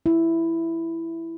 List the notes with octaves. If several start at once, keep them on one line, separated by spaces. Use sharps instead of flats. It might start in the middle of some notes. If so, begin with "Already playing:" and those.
E4